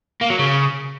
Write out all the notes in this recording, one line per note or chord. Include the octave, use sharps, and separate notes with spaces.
A#3
F#3
C#3